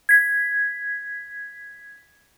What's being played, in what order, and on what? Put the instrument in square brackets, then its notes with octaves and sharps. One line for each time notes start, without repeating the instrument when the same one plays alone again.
[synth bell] G#6 B6